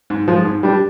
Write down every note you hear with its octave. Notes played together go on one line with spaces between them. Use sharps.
G#2
F3 G#3
G#2
G3 D4 G4